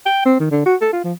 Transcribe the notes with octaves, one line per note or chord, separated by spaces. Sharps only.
G5
C4
D#3
D3
F#4
A4
F4
F3